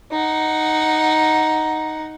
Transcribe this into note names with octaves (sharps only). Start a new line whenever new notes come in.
D#4 F#5